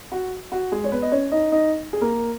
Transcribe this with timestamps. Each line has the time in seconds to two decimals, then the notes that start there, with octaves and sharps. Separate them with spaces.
0.12 F#4
0.52 F#4
0.72 G#3 G#4
0.84 C#5
0.92 B3 B4
1.02 D#5
1.12 C#4 C#5
1.32 D#4 D#5
1.52 D#4 D#5
1.93 G#4
2.01 A#3 A#4